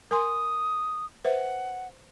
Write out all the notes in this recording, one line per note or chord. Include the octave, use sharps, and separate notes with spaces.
A#4 G#5 C6 D#6
B4 C5 E5 F#5